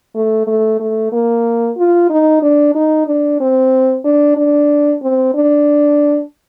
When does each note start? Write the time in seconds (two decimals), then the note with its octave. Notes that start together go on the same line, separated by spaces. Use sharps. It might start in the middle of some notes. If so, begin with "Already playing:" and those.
0.15 A3
0.47 A3
0.80 A3
1.12 A#3
1.78 F4
2.10 D#4
2.42 D4
2.75 D#4
3.07 D4
3.40 C4
4.05 D4
4.37 D4
5.03 C4
5.34 D4